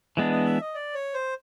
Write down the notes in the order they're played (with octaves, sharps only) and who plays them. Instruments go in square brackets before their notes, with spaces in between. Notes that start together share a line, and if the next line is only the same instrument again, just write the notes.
[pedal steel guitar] E3 G#3 B3 D4 [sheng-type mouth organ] D#5
[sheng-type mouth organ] D#5
E5
D#5
D5
C#5
C5